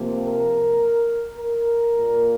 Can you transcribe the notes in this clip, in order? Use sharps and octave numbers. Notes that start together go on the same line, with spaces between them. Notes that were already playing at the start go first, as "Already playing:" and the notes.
Already playing: C3 F3 A#3
A#4
A#4
A#2 A#3